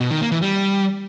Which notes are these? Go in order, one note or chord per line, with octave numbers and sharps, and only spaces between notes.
B2
D#3
A#3
E3
G3